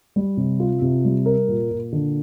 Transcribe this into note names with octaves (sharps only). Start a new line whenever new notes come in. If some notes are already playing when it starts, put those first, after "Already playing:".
G3
C3
F4
C3
G3
A#4
A#2
A#2
D3